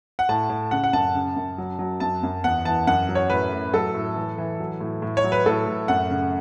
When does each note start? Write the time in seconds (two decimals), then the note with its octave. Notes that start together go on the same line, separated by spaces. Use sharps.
0.19 F#5
0.29 A2 A5
0.50 A2
0.71 C#3 F#5
0.84 F#5
0.93 F#2 A5
1.15 C#3
1.36 F#2
1.58 F#3
1.79 F#3
2.00 F#2 A5
2.23 F#2
2.44 E2 F#5
2.65 E3 A5
2.87 F#2 F#5
3.09 F#3
3.15 C#5
3.30 A2 B4
3.52 A2
3.73 F#3 A4
3.95 A2
4.16 E3
4.38 E3
4.60 F#3
4.80 A2
5.02 A2
5.17 C#5
5.24 F#3
5.32 B4
5.46 A2 A4
5.68 A2
5.88 F#2 F#5
6.11 C#3